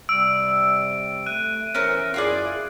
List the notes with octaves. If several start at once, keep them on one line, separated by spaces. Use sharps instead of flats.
C3 G3 E6 D7
A3 F#6 D#7
E3 C#4 A#4 C5 E5
F#2 E4 F4 G#4 D5